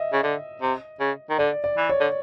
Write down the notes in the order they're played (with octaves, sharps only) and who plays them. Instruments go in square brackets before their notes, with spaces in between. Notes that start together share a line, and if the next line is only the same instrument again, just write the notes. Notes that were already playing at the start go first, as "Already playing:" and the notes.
Already playing: [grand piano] D#5 E5
[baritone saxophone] C#3
D3
C3
C#3
D#3
[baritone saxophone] D3 [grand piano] D5
[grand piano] D5
[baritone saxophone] E3
[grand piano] C#5
[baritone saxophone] D3